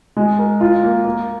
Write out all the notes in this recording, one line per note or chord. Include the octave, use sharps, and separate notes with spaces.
G#3
A#4
F4
A#3
A#3